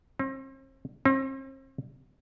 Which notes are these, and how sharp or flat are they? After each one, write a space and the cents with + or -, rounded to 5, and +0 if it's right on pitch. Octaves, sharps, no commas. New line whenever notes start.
C4 +40
C4 +40